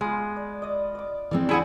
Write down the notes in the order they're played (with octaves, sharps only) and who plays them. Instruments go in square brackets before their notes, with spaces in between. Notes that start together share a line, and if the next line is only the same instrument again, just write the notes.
[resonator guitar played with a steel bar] G#3 [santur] B3 F4
[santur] D5
D5 D#5
D5 D6
[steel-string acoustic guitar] E3 G#3 C4 [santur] D5 E6
[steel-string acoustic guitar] E2 D4 [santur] C4 [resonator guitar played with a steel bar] E4 G#4 F#5